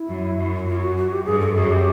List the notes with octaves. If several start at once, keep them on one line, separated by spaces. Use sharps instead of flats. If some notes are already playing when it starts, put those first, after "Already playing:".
Already playing: E4
F#2
F#2
F#2 F4
F#4
F#4
G4
G2 G#4
A4
F#2 G#4
G4